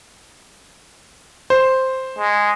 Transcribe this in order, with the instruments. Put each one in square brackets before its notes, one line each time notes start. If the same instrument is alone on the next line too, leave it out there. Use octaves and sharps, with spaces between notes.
[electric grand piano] C5
[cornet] G#3